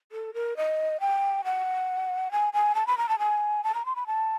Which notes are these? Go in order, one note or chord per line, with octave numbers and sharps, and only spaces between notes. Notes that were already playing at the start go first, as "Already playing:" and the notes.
A4
A#4
D#5
G5
F#5
G#5
G#5
A5
B5
A#5
A5
G#5
A5
A#5
C6
B5
A5